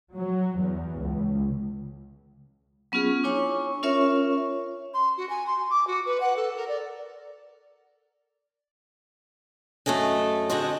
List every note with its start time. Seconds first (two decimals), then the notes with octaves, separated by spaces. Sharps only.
0.14 F#3
0.60 E2
1.01 C#2
2.92 F#3 B3 C#4 F4 G#4
3.24 D4 E4 C#5 G#5 C#6
3.83 C#4 F4 A#4 C#5 E5 C#6
4.93 C6
5.17 F#4
5.29 G#5
5.46 C6
5.70 D6
5.87 F#4
6.05 B4
6.20 F#5
6.36 A4
6.56 A#4
6.68 D5
9.86 F#2 A3 A4 D#5 G#5
10.50 D3 C4 F#4 G#4 A4 D#5